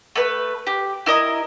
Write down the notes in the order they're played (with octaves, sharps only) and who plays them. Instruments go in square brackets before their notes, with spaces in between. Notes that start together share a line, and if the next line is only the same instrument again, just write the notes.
[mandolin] A3 B4
G4
E4 A#4 D#5